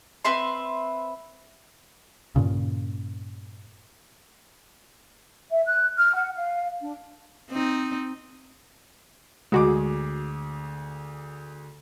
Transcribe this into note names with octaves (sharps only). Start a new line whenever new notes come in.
C4 B4 E5 C6
G2 A#2 C#3
E5
F#6
F6
F#5
F5
D4
C4 D#4
D2 G#3 F#4 G#4 D6